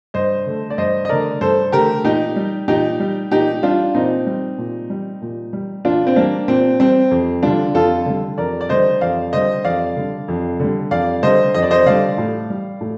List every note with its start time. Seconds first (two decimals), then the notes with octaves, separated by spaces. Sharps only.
0.14 G2 C5 D#5
0.46 D3 A3
0.70 D5
0.78 G2 C5 D#5
1.05 D#5
1.09 D3 A3 A#4 D5
1.41 G2 A4 C5
1.72 D3 A3 G4 A#4
2.04 A#2 D#4 G4
2.36 G3
2.68 A#2 D#4 G4
3.00 G3
3.31 A#2 D#4 G4
3.63 G3 D4 F4
3.94 A#2 C4 D#4
4.27 G3
4.58 A#2
4.90 G3
5.22 A#2
5.53 G3
5.85 A#2 D4 F4
6.07 C4
6.16 G3 A#3 D4
6.48 A#2 C4
6.79 G3 C4
7.11 F2
7.43 D3 G3 D4 F4
7.74 F2 F4 A4
8.06 D3 G3
8.38 F2 A#4 D5
8.61 D5
8.69 D3 G3 C5 D#5
9.01 F2 D5 F5
9.33 D3 G3 C5 D#5
9.64 F2 D5 F5
9.97 D3 G3
10.28 F2
10.60 D3 G3
10.91 F2 D5 F5
11.23 D3 G3 C5 D#5
11.54 F2 D#5
11.63 D5
11.71 C5 D#5
11.86 D3 G3 D5 F5
12.18 A2
12.50 G3
12.81 A2